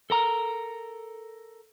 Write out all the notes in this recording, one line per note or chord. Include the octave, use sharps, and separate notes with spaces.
A4 A#4 A#5